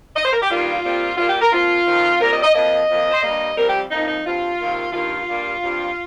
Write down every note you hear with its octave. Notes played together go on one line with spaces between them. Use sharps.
D#5
C5
A#4
G4
G2 D#3 G3 A#3 F4
A#2 G3 C4
A#2 G3 A#3 F4
G4
A#4
F2 F3 A#3 F4
F2 D#3 C4
A#2 G3 C4 A#4
D#5
D#5
F2 F3 A#3 D#5
F2 F3 A#3
C5
G2 G3 A#3 D#5
F2 C3 G3 C4 A#4
G4
F2 F3 A#3 D#4
D#4
G2 F3 C4 F4
C3 D#3 A#3
G2 D#3 A#3 F4
G2 G3 A#3
G2 G3 C4